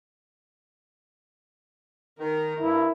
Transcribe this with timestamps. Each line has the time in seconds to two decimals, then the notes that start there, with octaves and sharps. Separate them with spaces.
2.19 D#3 A#4
2.60 G2 E4